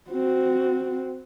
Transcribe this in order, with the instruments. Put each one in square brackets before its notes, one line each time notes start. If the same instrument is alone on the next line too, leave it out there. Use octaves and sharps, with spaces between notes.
[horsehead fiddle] C4 F#4